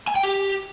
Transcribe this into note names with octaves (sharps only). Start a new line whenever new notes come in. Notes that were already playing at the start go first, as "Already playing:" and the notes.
G#5
G5
G4